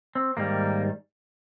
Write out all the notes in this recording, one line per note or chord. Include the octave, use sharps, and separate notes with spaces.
C4
G#2 D#3 G3 A#3